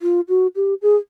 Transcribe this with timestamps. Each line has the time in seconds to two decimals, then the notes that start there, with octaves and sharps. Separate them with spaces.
0.02 F4
0.29 F#4
0.56 G4
0.82 G#4